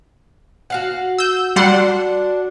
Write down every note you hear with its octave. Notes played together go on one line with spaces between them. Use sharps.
F#4 F5 F#5
E6 G6
G3 D4 F#4 D5 F#5 C6